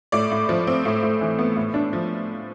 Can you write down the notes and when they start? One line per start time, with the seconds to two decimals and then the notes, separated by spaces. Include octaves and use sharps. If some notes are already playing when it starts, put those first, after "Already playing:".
0.12 A2 D5
0.31 A2
0.49 F3
0.67 C4
0.85 A2
1.02 A2
1.21 E3
1.39 B3
1.56 A2
1.74 D4
1.93 F3